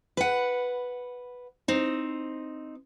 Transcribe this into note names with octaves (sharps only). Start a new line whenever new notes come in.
B4 F#5
C4 D#4